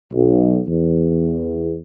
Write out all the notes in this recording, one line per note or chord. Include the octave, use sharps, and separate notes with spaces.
B1
E2